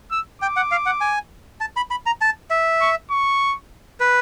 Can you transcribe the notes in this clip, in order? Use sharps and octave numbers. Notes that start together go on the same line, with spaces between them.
E6
G5 D6
F#5
F5
F#5
G#5
A5
B5
B5
A#5
A5
E5
C#6
C#6
B4